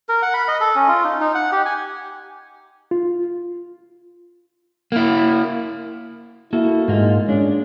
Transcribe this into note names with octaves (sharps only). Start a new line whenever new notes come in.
A#4
F#5
B5
D#5
A4
C#4
F4
D#4
D#4
F#5
G4
G#5
F4
A#3 E4
A#3 E4 F#4 A4
G#2 G#3 A#3 F4
G#3 C#4 D4